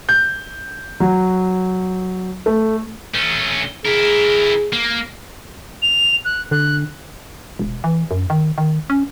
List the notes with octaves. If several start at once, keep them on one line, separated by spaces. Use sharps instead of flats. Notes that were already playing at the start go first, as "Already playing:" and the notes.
G6
F#3
A3
A3 C#4
E4 G#4 A#4
A#3
F7
F#6
D3 F#6
E1
E3
F#2
D#3
D#3
C#4